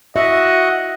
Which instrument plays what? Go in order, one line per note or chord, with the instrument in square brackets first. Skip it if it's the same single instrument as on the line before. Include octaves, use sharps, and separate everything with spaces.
[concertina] F#4 F#5 [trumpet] D#5 [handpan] E5